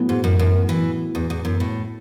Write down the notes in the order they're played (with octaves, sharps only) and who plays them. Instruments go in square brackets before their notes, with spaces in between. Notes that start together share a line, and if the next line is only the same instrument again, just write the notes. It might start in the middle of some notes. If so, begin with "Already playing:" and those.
Already playing: [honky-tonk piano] A2 F#3 B3
[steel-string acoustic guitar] G#2
F#2
F#2
E3
E2
E2
F#2
A2